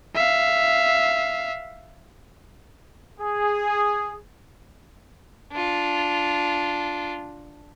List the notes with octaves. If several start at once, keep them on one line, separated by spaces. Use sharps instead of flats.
E5 F5
G#4
D4 F4